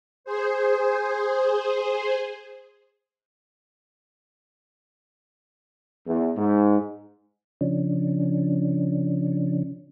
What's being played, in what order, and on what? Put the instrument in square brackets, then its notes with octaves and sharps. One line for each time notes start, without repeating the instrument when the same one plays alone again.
[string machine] G#4 C5
[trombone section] E2
G#2
[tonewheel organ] C#3 F3 C#4 D4